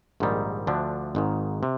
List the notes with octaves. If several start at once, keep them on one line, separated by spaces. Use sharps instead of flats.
A#1 G#2 D#3 G3
D2 D3 F3 A3 D4
G#1 G#2 D#3
C3